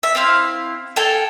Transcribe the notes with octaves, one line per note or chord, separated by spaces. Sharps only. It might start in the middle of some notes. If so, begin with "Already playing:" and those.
E5
C4 E4 F5 F6
A4 F5 G5 G#5